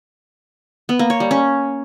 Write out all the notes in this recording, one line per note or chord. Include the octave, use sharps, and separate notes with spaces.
B3
A#3
C#5
G3
C#4